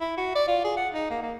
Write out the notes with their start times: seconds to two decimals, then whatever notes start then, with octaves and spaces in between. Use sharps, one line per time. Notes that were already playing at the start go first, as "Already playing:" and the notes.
0.01 E4
0.17 F#4
0.35 D5
0.48 F4
0.65 G#4
0.77 F#5
0.94 D#4
1.11 A#3
1.23 A#3